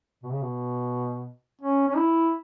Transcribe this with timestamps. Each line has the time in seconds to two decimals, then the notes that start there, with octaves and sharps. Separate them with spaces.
0.23 B2
0.31 C#3
0.42 B2
1.61 C#4
1.88 C#4
1.96 E4